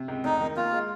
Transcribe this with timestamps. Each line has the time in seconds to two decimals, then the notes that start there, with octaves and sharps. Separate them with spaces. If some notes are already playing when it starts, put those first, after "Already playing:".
Already playing: C3
0.08 C#2
0.24 F1 D#4
0.41 D#3
0.56 D#2 F4
0.73 G#3